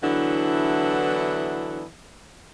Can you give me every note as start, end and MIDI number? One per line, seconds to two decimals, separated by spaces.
0.02 1.84 50
0.02 1.84 52
0.02 1.84 54
0.02 1.84 59
0.02 1.84 62
0.02 1.84 64